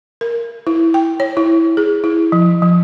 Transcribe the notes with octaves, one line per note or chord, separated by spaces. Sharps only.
A#4
E4
G5
C#5
E4
G#4
E4
F3
F3